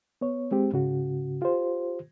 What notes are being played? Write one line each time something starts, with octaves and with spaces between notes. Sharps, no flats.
B3 C#5
G#3 C4 G4
G#2 C#3 F#4
F4 G4 C5